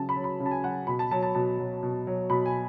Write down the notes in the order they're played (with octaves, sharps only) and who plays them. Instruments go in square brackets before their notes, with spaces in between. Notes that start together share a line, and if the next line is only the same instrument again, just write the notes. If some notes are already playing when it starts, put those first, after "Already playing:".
Already playing: [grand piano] C#3 F#3 A5
B5
F#3
B5
C#3
A5
G#5
F#3 F#5
B2 B5
A5
F#3 A5
A5
B2 A5
F#3
B2
F#3
B2 B5
G#5